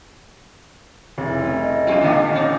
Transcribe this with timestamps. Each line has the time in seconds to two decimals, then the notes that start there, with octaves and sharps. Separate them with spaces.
1.18 F1 A2 C#3 G4 E5
1.38 B2 G3 B3 C#4 G#5
1.59 F3 B3 E4 D#5
1.87 F2 G3 F4
2.01 A#2 D3 E3 B3 D4 G4 F5
2.33 C4 C#4 D#4